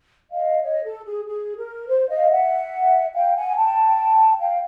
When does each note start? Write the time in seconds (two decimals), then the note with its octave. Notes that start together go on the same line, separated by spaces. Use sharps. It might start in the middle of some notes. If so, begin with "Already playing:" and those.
0.31 D#5 F5
0.63 C#5 D#5
0.83 A4
1.04 G#4
1.26 G#4
1.57 A#4
1.88 C5
2.09 D#5 F5
2.30 E5 F#5
3.14 F5 G5
3.35 F#5 G#5
3.56 G5 A5
4.40 F5 G5